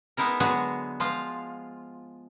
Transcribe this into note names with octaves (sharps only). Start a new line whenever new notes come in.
G#3 B3 D#4 E4 A#4
D3 F#3 G#3 B3 F#4 G#4
F3 G#3 F4 F5